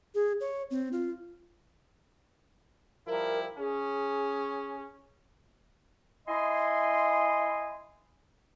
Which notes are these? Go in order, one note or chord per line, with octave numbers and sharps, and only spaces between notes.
G#4
C#5
C4
F4
F3 G3 E4 A#4
C#4 G#4
E4 D#5 G#5 C6